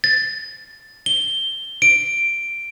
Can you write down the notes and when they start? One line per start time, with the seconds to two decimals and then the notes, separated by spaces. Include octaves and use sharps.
0.04 A6
1.06 G7
1.82 D7